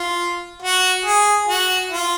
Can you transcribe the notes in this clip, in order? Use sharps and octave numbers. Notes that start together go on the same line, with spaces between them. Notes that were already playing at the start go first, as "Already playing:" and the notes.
Already playing: F4
F#4
G#4
F#4
F4